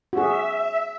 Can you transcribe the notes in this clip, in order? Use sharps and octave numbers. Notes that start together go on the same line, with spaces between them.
F#4 G#4 E5